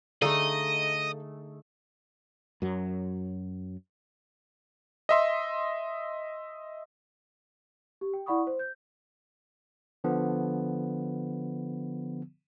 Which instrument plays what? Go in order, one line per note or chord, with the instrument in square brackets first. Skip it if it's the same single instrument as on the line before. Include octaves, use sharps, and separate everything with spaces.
[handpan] D3 G#4 [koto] A3 D#4 [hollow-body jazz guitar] A4 D5 F5 [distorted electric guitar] D#5
[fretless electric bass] F#2 F#3
[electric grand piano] D#5 E5 C6
[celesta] G4
G5
E4 D5 F#5 B5 C#6 D#6
C5
G6
[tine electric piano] D3 F3 B3